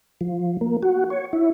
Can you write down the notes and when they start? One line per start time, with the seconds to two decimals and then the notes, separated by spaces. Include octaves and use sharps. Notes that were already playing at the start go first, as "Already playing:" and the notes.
0.21 F3
0.61 A#3
0.83 F#4
1.10 C#5
1.33 E4